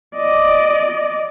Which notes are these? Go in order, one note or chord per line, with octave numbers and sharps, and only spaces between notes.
D5 D#5